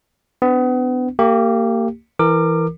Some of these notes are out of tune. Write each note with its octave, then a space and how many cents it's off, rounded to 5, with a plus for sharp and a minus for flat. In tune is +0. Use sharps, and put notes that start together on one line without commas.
B3 +35 D4 +0
A#3 -30 G4 +0
E3 +0 A#4 -20 D6 +20